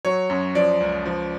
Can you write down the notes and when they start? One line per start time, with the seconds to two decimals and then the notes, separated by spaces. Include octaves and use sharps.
0.05 F#3 C#5
0.30 F#2
0.55 F3 D5
0.81 C#2
1.06 F3